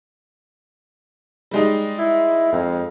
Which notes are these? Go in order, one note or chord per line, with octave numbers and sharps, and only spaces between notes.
G3 G#3 D#4
E4
F2